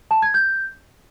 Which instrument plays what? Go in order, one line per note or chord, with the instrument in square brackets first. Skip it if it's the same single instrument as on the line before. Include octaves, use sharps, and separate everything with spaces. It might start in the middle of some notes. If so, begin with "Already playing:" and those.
[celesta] A5
G#6
G6